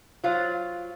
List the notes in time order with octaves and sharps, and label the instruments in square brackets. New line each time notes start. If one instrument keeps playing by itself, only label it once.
[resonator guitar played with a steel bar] F#3 F4 C5 F5